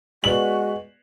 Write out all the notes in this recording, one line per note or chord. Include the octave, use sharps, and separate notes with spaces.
G#3 B3 F#4 B4 D5 F#7